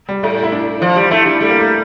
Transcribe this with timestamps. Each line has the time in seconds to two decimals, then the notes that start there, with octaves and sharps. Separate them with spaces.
0.09 G3
0.23 A2 A3
0.43 E4
0.52 D4
0.82 F3
0.96 G3
1.11 A3 E4
1.26 G3 D4
1.40 G3 A3
1.50 A#3
1.61 A3